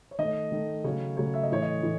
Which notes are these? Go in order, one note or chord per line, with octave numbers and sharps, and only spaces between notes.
C#5
D#3 A3 D#5
D#3 A3
C#3 F#3 A3 C#5
C#3 F#3 A3 C#5
E5
D#5
A2 E3 A3 C#5
D#5
A2 E3 A3